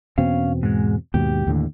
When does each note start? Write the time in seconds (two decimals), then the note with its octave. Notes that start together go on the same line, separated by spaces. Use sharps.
0.18 E2 B2 C4 C#4 F5
0.63 G#2 G#3
1.14 D#2 G#2 B2 G4
1.47 D#2 A2 D3